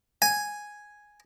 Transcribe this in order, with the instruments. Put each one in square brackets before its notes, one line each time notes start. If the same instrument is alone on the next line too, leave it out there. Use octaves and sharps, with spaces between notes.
[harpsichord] G#5